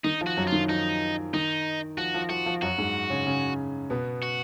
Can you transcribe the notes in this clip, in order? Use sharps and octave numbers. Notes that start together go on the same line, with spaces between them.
D#3 D#4
F3
F#4
F#2 F#3
D#3 F4
F3 D#4
D#3 D#4
F3 F#4
F3
F3 F#4
F3
F#2 F#3 F#4
G#2 G#3
C#3 C#4
C#3 C#4
B2 B3
F#4